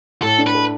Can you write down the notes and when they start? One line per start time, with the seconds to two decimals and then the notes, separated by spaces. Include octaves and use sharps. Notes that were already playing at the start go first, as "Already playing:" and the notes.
0.22 A2 A4
0.38 D4
0.47 B4
0.54 A4